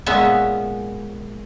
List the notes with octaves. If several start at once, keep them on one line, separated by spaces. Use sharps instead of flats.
A#2 G#3 B3 C#4 E5 A#5